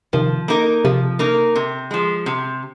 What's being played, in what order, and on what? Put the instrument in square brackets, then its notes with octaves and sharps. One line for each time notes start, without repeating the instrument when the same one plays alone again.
[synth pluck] C3 D#3 [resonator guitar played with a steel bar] F3
[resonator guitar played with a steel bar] A#3 D#4 A#4
[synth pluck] C3 [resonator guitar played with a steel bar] F3
[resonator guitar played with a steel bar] A#3 D#4 A#4
C3
F3 G#3
C3